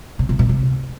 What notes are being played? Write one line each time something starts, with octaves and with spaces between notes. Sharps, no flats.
C3
C3
B2
C3